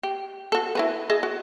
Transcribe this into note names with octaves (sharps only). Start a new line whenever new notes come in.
G4
F#4 A4
E4 F#4 B4
G#4 D#5 E5
F#4